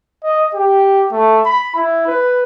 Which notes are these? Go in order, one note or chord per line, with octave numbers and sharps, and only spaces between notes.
D#5
G4
A3
B5
E4
B4